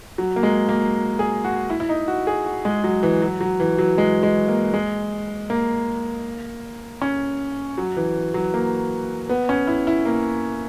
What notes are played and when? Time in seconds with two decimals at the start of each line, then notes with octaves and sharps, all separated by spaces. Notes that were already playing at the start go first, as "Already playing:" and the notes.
0.18 F#3
0.36 A#3
0.43 G#3
0.69 A#3
1.19 G#4
1.44 F#4
1.70 E4
1.80 E4
1.89 D#4
2.08 F#4
2.27 G#4
2.46 F#4
2.65 G#3
2.84 F#3
3.03 E3
3.22 F#3
3.41 F#3
3.60 E3
3.78 F#3
3.98 G#3
4.23 G#3
4.48 A#3
4.74 G#3
5.50 A#3
7.02 C#4
7.78 F#3
7.97 E3
8.34 F#3
8.54 A#3
9.29 B3
9.49 C#4
9.67 E4
9.87 E4
10.05 A#3